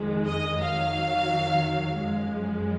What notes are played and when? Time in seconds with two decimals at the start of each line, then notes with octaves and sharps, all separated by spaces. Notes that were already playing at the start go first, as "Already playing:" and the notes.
Already playing: F2 D#3 G#3
0.26 D#5
0.60 F2 D#3 F#3 F5
1.98 F#2 F3 G#3